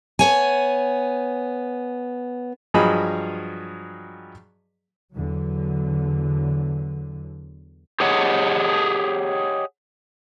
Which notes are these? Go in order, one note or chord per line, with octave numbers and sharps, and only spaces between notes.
B3 C#5 G#5
G2 F3 F#3 G#4 D#5 B5
E2 D3 F#3
G4 G#4 C#5 D#5 F#5